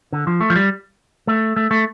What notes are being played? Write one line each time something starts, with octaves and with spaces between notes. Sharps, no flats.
D3
F3
A3
F3
G3
A3
A3
A3